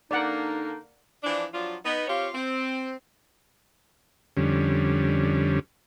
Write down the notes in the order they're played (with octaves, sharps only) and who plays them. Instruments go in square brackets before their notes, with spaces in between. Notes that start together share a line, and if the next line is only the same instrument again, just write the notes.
[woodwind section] D3 D4 D#4 [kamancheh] A#3 [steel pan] D5 F#5
[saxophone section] E3 F3 D4
F3 F#3 D4 F4
B3 D#4
C4 F4 G4 C#5 F5
C4
[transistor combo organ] F2 D3 G3 C#4